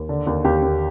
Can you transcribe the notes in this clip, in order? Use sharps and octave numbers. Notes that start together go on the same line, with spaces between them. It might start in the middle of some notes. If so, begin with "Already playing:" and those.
Already playing: D#2
D3
D#2
D#2 G4
D#2